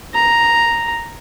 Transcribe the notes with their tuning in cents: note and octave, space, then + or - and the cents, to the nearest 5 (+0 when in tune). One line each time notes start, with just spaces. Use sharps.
A#5 +0